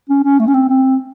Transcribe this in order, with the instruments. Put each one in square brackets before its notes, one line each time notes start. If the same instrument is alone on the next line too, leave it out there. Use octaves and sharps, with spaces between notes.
[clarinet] C#4
C#4
A3
C#4
C4
C4